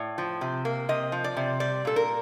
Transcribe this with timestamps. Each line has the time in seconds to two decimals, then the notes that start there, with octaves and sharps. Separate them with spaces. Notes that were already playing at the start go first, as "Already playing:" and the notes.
Already playing: A2 D5
0.18 F3
0.41 C3
0.65 A#3
0.89 C3 D#5
1.12 F3
1.24 D5
1.36 C3
1.60 G3 D5
1.85 A#2 A4
1.96 A#4